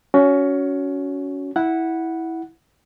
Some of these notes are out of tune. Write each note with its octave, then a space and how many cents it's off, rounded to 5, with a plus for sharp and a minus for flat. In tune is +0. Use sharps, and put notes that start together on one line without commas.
C#4 +20 F#4 +0
E4 -10 F#5 +0